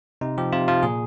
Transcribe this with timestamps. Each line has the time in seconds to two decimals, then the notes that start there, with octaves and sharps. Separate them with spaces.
0.21 C3 D#4
0.38 F3 G4
0.53 C3 F4
0.68 F3 F4
0.83 A#2 G#4